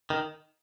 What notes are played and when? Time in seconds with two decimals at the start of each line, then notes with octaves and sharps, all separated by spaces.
0.10 D#3